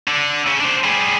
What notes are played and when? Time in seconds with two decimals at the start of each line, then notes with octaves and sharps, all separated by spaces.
0.08 D3
0.46 C#3 C#4
0.60 D4 C5
0.84 G3 G#4